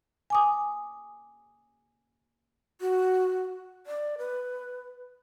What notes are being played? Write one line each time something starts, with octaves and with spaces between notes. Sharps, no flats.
G#5 D6 D#6
F#4
D5
B4